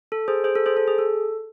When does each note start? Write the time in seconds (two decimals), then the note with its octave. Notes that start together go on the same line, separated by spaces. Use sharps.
0.12 A4
0.28 G#4 C5
0.44 G#4 C5
0.55 A4
0.66 G#4 C5
0.77 A4
0.88 G#4
0.98 A4